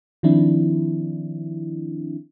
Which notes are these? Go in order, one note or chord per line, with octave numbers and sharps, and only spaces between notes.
D#3 F3 C4 D4 E4